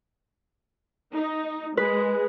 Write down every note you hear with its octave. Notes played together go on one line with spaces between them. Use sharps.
D#4
G#3 B4